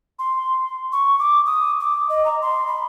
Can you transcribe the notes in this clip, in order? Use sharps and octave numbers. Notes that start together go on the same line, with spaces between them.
C6
C#6
D6
D#6
D6
D#5
A#5
C6
B5